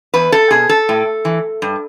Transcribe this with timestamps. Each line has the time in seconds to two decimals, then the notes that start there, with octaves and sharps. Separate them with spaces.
0.14 E2 B4
0.32 A4
0.51 B2 G#4
0.69 A4
0.89 A2
1.25 E3
1.62 G2